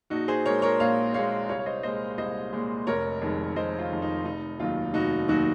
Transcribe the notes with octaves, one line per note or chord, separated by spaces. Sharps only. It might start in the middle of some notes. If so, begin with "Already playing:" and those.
A#1 D#4 F#4
G#4 C5
A#2 G#3 A#4 C#5
A#4 C#5
A#1 C#5 F5
A#2 G#3 C#5 F5
C2 C#5 F5
C#5
C5 D#5
A#2 G#3 C5 D#5
C2 C5 D#5
A#2 G#3
F1 A#4 C#5
F2 D#3 G#3
F1 C5 D#5
F4
F2 D#3 G#3
D#4
F1 D#4
D#2 D#3 F#3 F4
F1 D#4 F#4
D#2 D#3 F#3 D#4 F#4